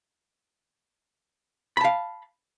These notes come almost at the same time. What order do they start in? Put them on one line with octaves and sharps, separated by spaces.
B5 A5 F5